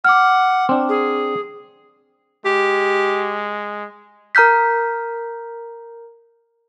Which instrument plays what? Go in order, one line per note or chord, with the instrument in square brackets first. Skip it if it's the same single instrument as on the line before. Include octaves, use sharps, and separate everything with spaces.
[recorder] F#5 [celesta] D6 F6
[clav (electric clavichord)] C4 D4
[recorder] G#4
[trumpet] G#3 [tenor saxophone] G4
[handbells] A#4 A#5 F6 G6 B6